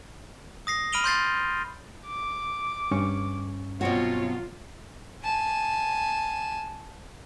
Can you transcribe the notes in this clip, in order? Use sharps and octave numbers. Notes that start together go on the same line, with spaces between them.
D#6 A#6 C7
B5 F6 D7 D#7 F7 G7
C6 G6 A6 C7
D6
G2 C#4 C#6
B2 F#3 C4 F4 F#4 C#5
G#5 A5